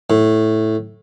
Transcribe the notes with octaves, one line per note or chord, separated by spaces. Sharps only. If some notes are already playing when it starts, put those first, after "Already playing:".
A2